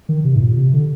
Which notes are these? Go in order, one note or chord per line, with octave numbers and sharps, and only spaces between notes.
D#3
C3
G#2
A#2
C3
D3